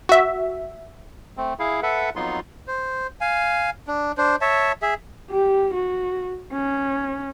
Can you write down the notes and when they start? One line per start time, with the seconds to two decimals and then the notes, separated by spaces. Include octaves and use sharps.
0.09 F#4 E5
1.37 A3 C4
1.59 E4 G#4 F5
1.83 A4 B4 E5 F#5
2.16 F2 F#3 B3 D#4 F4 C6
2.68 C5
3.21 F5 G#5
3.87 D4
4.18 D4 C5
4.41 C#5 E5 A5
4.82 G#4 E5
5.31 G4
5.74 F#4
6.53 C#4